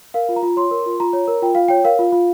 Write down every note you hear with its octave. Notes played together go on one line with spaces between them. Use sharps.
A#4 F5
F4
A#5
F4
C#5 C6
A#4
F4
F4 A#5
C#5
A#4
F4 G5
F4 F5
C#5 G5
A#4 F5
F4
F4